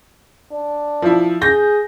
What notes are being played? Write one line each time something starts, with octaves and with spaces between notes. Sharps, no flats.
D4
F3 E4
G#4 G6 A#6